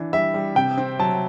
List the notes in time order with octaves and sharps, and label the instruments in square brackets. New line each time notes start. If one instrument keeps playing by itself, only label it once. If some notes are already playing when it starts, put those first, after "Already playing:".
Already playing: [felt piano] E3 D4
[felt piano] G3 [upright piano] E5
[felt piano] G3
[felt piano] C3 [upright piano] G5
[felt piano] C4
[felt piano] F#3 [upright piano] A5